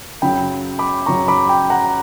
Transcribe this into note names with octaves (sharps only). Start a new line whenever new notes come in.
F#2 C#3 F#3 G5 B5
B5 D6
F#2 C#3 F#3 A#5 C#6
B5 D6
G5 B5
F#5 A#5